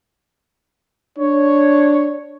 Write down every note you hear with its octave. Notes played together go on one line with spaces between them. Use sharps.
D4 C#5